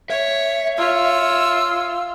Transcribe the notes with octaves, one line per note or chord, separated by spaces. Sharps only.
C#5 E5
F4 C#5 E6